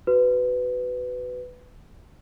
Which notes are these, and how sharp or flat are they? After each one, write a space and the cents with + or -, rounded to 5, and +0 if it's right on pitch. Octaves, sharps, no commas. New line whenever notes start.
F#4 +15 B4 +15